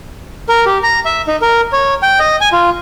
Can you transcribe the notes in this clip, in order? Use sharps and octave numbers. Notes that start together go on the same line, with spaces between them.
A#4
G4
A#5
E5
D#4
A#4
C#5
G5
D#5
G#5
F4